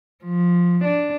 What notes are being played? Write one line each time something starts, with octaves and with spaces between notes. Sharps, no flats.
F3
D4